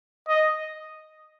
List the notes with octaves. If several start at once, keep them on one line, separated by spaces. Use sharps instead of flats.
D#5